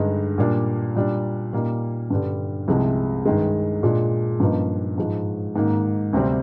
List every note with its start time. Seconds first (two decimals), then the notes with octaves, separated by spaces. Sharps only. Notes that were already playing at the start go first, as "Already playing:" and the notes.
Already playing: G2 D3 G#3 D#4
0.38 A#2 G3 A#3 D4
0.96 A#2 G3 D4
1.53 A#2 G3 A#3 D#4
2.10 G2 D3 G3
2.68 C2 C3 F3 G#3
3.25 G2 D#3 G#3
3.83 A#2 G#3 D4
4.40 G2 F3 A#3 D#4
4.98 G#2 F3 G#3
5.56 G#2 D#3 A#3
6.13 D2 C3 G3 C4